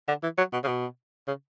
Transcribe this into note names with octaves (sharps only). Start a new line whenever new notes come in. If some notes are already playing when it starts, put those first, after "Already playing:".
D3
E3
F#3
B2
C#3
B2
C#3